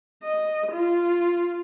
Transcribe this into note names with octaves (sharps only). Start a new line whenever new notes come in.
D#5
F4